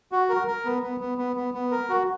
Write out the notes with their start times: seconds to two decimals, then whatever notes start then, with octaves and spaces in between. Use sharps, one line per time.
0.12 F#4
0.29 A#4
0.47 A#4
0.65 B3
0.83 B3
1.00 B3
1.18 B3
1.36 B3
1.54 B3
1.72 A#4
1.90 F#4